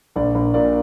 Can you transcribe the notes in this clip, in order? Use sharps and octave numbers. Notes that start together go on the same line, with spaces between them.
A#1 D5
A#1
A#2 D5